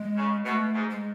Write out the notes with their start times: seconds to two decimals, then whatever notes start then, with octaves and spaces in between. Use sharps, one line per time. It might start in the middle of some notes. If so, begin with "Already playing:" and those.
Already playing: G#3
0.17 C#3
0.45 B2 A3
0.75 G#2
0.90 G#3